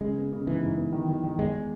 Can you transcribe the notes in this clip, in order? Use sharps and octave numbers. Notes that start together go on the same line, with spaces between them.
C#3 G#3
B3
C#3
G#2 E3
G#2
B3
D#3
D#3
D#3
E2 G#3